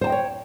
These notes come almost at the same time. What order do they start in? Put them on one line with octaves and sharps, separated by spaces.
C5 A5 G5 D#5 C#5